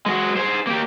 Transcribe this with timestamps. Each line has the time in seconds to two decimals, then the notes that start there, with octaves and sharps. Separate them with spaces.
0.06 G#3 F#4
0.37 G#4 C5
0.67 A#3 G4